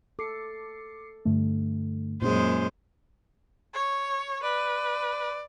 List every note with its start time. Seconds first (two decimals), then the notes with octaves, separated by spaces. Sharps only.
0.19 A4 D6 C7 C#7
1.25 G2 D3 A3
2.22 F#2 A#2 G#3 C#4 G#4 C5
3.74 C#5
4.43 B4 D5